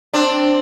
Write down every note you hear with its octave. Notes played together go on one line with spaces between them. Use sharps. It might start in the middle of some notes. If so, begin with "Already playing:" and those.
C4 D4